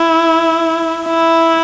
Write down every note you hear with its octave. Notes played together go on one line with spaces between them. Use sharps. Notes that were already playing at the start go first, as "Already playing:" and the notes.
Already playing: E4
E4